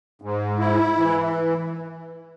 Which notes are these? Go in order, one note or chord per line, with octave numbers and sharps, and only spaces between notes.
G#2
E4
E3